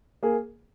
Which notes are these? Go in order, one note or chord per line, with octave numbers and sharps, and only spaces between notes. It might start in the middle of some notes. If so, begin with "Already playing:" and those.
A#3 G#4